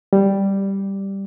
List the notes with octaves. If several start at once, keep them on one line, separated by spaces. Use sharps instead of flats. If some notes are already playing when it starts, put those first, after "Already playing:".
G3